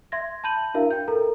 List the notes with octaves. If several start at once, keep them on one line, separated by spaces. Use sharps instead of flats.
E5 C6 G#6 A#6
A5 B5 G6 D#7 F#7
D4 E4 F#4 A#4 E5 F5
G5 G6
A4 A#4 A#5